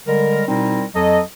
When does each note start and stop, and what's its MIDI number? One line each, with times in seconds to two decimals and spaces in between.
0.07 0.43 50
0.07 0.43 55
0.07 0.43 56
0.07 0.43 70
0.48 0.84 47
0.48 0.84 55
0.48 0.84 60
0.48 0.84 63
0.48 0.84 64
0.48 0.84 70
0.94 1.20 41
0.94 1.20 54
0.94 1.20 69
0.94 1.20 75